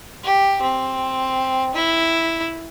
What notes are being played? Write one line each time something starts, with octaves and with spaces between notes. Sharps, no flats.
G4
C4
E4